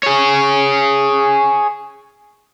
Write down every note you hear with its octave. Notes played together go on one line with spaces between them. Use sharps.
G#4 C#5